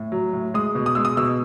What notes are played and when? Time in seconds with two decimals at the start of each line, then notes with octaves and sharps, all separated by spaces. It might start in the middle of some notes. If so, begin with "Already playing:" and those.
Already playing: A2
0.12 F#3
0.33 A2
0.54 G#3 D#6
0.75 B2
0.86 D#6
0.95 G#3 E6
1.05 D#6
1.17 B2 E6